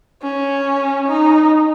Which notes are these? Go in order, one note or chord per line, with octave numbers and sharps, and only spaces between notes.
C#4
D#4